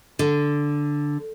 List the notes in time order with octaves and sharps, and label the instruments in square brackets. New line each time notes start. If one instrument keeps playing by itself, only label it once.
[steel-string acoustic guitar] D3